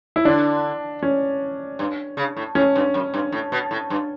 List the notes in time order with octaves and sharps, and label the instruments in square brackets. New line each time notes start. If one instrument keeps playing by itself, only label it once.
[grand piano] E4
[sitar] D3 [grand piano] D4
[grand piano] C#4
[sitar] G2
C#3
A2
[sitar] A2 [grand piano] C#4
[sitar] G2
F#2
G2
A2
B2
A2
G2